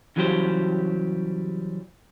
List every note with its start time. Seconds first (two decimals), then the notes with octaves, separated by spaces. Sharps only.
0.16 C#3 E3 F#3 G3 G4 C5